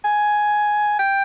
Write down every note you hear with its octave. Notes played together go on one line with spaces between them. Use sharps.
G#5
G5